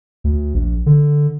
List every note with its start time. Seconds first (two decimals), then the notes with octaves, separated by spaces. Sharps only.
0.24 D2
0.54 A#1
0.86 D3